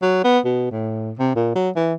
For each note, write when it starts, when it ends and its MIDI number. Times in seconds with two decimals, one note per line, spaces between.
0.02 0.24 54
0.24 0.39 59
0.45 0.69 47
0.72 1.12 45
1.19 1.31 48
1.35 1.53 46
1.56 1.70 54
1.76 1.94 52